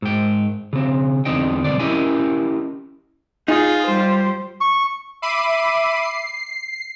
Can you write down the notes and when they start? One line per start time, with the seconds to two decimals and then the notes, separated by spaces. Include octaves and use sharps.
0.02 G#2 G5
0.73 C#3 C4
1.25 E2 D3 C4 D#4 D#5 G5
1.65 B1 G2 B2 C4 D5
1.80 C#4 E4 G4 A#4 D#5 G#5
3.48 D#4 F4 G#4
3.87 G3 C5
4.61 C#6
5.22 E5 B5 D6 C7 D#7
6.02 C7